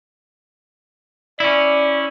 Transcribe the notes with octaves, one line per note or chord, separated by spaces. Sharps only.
C#4 E4 D5